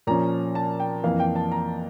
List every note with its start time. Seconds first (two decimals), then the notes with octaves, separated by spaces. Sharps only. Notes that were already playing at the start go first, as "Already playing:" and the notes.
0.07 A#2 F3 C#4 A#5
0.55 A5
0.80 G5
1.04 F2 E3 A#3 F5
1.20 G5
1.35 A5
1.52 A#5